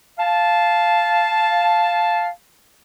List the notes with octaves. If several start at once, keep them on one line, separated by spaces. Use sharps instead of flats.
F5 A5